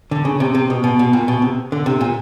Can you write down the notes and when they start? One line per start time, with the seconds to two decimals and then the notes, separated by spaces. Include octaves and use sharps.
0.11 D3
0.25 C#3
0.40 C3
0.55 C3
0.70 B2
0.84 B2
0.99 B2
1.13 A#2
1.28 B2
1.42 C3
1.72 D3
1.86 C3
2.01 A#2